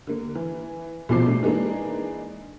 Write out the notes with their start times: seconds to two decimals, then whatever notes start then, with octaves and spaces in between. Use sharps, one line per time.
0.07 D3 A#3
0.35 E3
1.09 B1 E2 A#2 F3 D6 C7
1.26 A3 D4
1.43 E3 G#3 A#3 D4 D#4